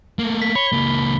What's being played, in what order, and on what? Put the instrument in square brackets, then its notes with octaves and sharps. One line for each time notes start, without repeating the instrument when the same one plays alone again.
[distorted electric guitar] A3 A#3
[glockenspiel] B6
[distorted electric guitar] C#5 [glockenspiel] B5 G7
[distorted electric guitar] C#2 A#3